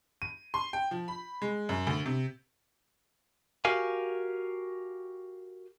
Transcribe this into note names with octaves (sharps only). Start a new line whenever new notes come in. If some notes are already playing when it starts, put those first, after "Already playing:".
D#7
C6
G5
F3
B5
G#3
F#2
D2
C3
F#4 G4 A#4 F5 G#5